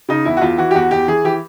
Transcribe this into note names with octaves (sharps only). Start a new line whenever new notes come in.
C#3 D#4
E2 E4
F#4
E2 F4
E3 F#4
G4
E2 F#4
E2 G4
E3 G#4
E3 G4